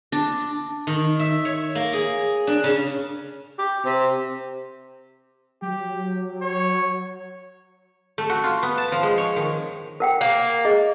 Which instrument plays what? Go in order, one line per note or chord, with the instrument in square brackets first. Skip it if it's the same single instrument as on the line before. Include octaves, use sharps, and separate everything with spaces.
[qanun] D4
[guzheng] D#3
E5
C#5
A#3
G#4
D4
C#3
[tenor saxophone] G4
C3
[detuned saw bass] F#3 [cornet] G4
[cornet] C#5
[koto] A3
F#4
F4
B3
A5
F3
G#3
C#5
D#3
[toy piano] A#4 F#5 G5
[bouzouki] A#3
[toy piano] G#4 D#5